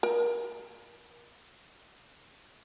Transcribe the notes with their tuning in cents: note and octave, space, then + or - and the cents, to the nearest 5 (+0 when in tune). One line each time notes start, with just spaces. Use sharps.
A#4 +30